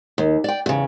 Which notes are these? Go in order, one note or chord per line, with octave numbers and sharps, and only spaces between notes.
D#2
D5 G5
E2 C#3